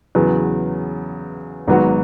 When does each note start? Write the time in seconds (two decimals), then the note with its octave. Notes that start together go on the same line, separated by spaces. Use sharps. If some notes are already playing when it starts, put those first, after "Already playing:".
0.15 E2 C#3 F#3 B3
1.67 G#1 G#2 F#3 B3 F#4